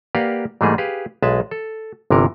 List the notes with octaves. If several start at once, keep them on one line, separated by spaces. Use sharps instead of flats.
A#3 G4 B4 D5 F5 F#5
G#2 E3 G3 A3 A#3 G#4
G4 G#4 B4 F5
B1 G#3 B4 E5 A5
A4
G1 C3 E3 A#4